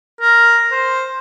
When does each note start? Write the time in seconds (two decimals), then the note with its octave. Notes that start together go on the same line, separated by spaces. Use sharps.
0.21 A#4
0.71 C5